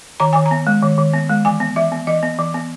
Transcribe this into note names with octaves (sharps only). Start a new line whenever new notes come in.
D#3 A#5
D#3 G#5
A#5
B3
G#3
D#3
D#3
B3
G#3
E3 G#5
B3
E3 E5
B3
E3 D#5
B3
E3
B3